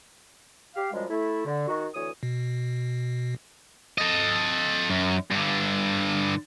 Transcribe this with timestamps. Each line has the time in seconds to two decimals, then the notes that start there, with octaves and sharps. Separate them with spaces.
0.75 G4 F5
0.93 F#2 F3 G3 G#3
1.10 A3 E4
1.45 D3
1.67 D#3 F#4
1.95 D2 E3 C#5 D#6
2.23 B2
3.98 A4 D#5
4.90 F#2
5.31 G2 D3